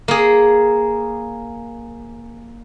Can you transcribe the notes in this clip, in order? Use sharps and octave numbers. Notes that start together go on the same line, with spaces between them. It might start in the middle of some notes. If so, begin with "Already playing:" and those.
A#3 G#4